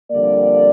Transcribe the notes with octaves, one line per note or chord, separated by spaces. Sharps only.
F2 D3 G3 A#3 D5